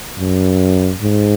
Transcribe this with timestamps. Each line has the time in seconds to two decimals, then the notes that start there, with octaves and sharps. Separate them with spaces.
0.19 F#2
1.02 G#2